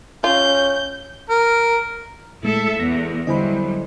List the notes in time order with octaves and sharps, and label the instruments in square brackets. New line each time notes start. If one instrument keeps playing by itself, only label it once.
[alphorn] C#4 [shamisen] F4 [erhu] G6
[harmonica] A#4
[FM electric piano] A#2 G#3 A3 [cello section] E4 A4 E5
[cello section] E2 [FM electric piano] A#6
[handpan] D3 E4 C5 [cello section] F#3 G3 [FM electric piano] D#5 G#5 B5